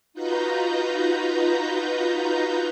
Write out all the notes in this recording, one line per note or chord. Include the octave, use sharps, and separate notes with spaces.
D#4 F4 F#4 B4 A#5 G6